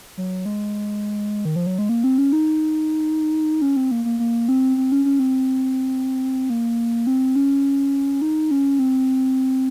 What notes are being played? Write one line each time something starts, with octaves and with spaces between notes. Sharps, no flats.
F#3
G#3
D#3
F3
F#3
G#3
A#3
C4
C#4
D#4
C#4
C4
A#3
A#3
A#3
C4
C4
C#4
C#4
C4
A#3
C4
C#4
D#4
C#4
C4